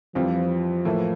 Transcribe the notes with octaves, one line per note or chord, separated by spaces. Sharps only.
F2 E3 F3 G3 C4 F4
A2 E3 A#3 E4 A4